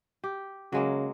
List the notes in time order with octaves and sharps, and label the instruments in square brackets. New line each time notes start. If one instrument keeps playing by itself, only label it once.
[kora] G4
[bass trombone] C#3 [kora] F#3 G#3 A#3